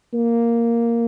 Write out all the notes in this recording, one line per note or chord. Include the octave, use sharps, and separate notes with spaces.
A#3